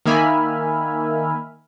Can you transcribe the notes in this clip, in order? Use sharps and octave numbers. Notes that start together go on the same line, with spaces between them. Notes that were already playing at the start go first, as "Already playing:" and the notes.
D#3 A#3 E5 G#5 B5 F6